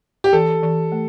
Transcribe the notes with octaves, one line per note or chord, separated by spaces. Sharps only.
G4
E3 A4
E3
A3